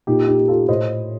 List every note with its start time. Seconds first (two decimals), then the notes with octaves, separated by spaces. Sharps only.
0.07 A#2 D#4 G4
0.27 D#4 G4
0.39 G4
0.48 F4 A4
0.68 A2 C5 D#5